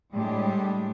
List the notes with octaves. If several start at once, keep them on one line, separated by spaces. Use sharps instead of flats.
A2 G3 G#3 D4 G4